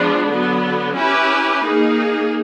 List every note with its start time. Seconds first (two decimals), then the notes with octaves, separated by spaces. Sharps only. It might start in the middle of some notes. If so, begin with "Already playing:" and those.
Already playing: F3 G#3 B3 D4
0.28 D3 F#3 B3
0.96 C#4 E4 G4 B4
1.65 A#3 D#4 G#4